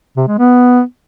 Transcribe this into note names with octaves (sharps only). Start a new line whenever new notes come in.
C3
G#3
B3